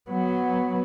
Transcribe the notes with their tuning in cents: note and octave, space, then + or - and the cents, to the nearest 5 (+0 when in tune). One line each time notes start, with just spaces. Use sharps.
F#3 +0 B3 +0